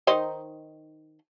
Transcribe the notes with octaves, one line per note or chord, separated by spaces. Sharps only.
D#3 D#4 C5